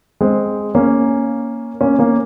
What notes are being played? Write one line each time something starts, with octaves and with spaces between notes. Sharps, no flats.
G#3 C4
A#3 C#4
A#3 C#4
A#3 C#4